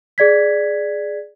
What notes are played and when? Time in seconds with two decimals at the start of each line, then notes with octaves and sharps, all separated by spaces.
0.18 G#4 D5 G#6 B6